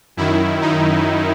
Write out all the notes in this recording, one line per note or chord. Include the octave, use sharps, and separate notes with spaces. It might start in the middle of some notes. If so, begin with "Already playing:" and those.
F#2 D#3 E4
D#4